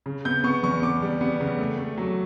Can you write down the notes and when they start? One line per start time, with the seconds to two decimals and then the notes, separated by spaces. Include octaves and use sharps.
0.06 C#3
0.25 B3 G6
0.44 B3 C#6
0.63 E2 C#6
0.82 B3 D6
1.02 G3
1.21 B3
1.40 C#3
1.59 A3
1.78 A3
1.98 F#3